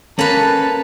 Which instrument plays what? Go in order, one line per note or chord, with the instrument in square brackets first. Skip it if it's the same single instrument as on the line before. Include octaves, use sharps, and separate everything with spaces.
[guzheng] A#3 B4 [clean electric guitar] C#4 [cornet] A5